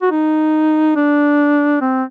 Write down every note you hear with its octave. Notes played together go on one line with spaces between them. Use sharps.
F#4
D#4
D4
C4